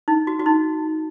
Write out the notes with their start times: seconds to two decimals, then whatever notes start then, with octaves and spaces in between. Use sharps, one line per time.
0.08 D#4
0.27 F#4
0.40 F#4
0.46 D#4